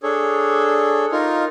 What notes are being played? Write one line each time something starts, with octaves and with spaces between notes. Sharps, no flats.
D4 G#4 A4 C#5
D#4 F4 A#4